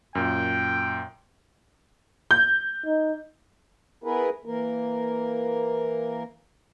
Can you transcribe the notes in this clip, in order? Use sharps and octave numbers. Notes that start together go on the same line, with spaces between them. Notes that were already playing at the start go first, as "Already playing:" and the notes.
F#2 A#2 G5
G6
D#4
B3 E4 G#4 A#4 B4
E3 A#3 A#4